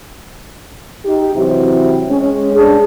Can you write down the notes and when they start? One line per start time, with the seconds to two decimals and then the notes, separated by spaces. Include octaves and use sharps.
1.05 D#4 G4
1.35 C3 E3 F#3 C4 E4
2.10 G#3 C#4
2.54 G2 D4 G#4